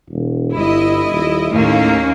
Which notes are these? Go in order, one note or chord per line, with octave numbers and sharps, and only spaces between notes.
E1
G1 E4 D#5
D#1
D#2 A2 A#3 C#4